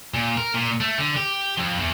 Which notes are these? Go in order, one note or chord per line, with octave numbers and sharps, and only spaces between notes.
A#2
A#4
A#2
A3
D3
G4
F2
E2